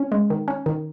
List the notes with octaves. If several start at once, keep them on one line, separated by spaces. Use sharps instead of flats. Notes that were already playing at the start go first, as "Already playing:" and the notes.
Already playing: C#4
G#3
D#3
C#4
D#3